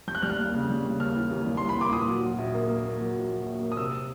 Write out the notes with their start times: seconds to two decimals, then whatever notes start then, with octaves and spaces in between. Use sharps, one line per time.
0.08 G3 G6
0.15 F#6
0.22 G3 F6
0.30 F#6
0.39 D#2
0.54 C#3
0.70 G3
0.85 C#3
0.99 D#2 F6
1.16 E3
1.31 D#2
1.46 G3
1.57 C6
1.62 E3
1.69 B5
1.76 D#2 D6
1.92 A#2 D#6
2.08 F#3
2.23 F#3
2.38 A#1
2.54 A#3
2.69 A#3
2.85 A#3
3.00 F#3
3.15 A#1
3.31 F#3
3.46 A#1
3.62 A#3
3.72 D#6
3.77 C3 E6